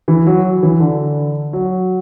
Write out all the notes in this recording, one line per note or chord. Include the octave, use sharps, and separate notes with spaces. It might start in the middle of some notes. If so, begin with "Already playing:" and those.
E3
F#3
E3
D3
F#3